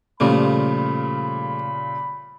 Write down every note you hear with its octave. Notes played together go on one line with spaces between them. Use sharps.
A#2 C#3 F3 G3 A3 B5